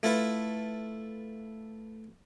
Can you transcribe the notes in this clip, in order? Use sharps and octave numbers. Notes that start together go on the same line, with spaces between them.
A3 E4 F4 A4 B4